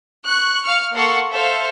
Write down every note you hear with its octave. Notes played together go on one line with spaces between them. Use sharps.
C#6 F#6
F5 C#6 F6 C#7
A#3 A4 F5 F#5 C6 C#6
A4 C5 E5 F5